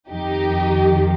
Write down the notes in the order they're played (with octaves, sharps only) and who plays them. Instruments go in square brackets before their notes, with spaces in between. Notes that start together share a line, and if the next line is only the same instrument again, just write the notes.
[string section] F2 D#3 D#4 G4